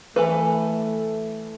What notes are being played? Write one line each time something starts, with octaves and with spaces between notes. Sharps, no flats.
E3 A3 A4 B4